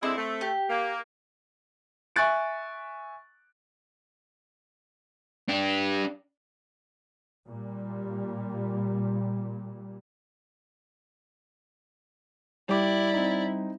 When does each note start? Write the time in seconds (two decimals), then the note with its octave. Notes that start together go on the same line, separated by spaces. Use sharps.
0.03 D3 G#3 C4 E4
0.18 A3
0.41 G4
0.70 A#3
2.16 E5 G#5 C#6 F#6 A6 D7
5.49 D4 G4
7.47 A#2 G3
12.69 G3 E4 G4 D5 D6
13.13 C4 D#4